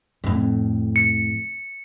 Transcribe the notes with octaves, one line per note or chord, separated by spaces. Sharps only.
F2 A2
C#7